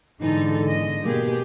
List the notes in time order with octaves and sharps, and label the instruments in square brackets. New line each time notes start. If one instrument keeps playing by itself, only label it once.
[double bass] G#2 D3 [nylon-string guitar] E3 [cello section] D#4 A4
[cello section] B3 D#5
[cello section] B2 G4 G#4 [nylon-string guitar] G#3 A#3